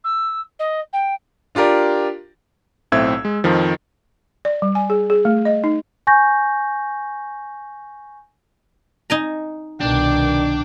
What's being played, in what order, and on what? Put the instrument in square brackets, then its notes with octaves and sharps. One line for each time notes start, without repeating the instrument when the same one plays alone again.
[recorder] E6
D#5
G5
[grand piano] D4 F4 G4 A#4 D5
[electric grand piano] B1 A2 C4 E5 E6 G#6
G#3
F2 D#3 F3
[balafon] D5
G3
G#5
G#4
G#4
A3
D#5
D#4
[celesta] G#5 C#6 G6 A#6
[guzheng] D#4 G#5 A#5
[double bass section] C2 B2 D#3 [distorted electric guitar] D4 [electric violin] G5 D6